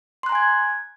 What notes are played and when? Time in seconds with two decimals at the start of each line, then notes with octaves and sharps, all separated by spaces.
0.23 C6
0.26 F#6
0.29 A#5
0.32 G#5
0.35 G#6